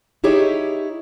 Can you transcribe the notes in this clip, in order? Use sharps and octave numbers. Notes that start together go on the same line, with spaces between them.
D#4 E4 G4 G#4 C#5